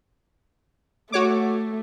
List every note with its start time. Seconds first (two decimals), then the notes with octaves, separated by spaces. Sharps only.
1.12 A3 F#4 C#5 D6